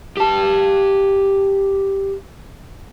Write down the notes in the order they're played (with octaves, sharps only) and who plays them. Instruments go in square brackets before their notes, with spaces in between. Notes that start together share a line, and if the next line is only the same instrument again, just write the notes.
[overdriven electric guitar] G4 A5